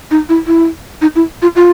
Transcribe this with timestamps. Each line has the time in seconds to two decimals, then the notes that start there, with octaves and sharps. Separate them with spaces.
0.11 D#4
0.29 E4
0.47 E4
1.02 D#4
1.16 E4
1.42 F4
1.56 F4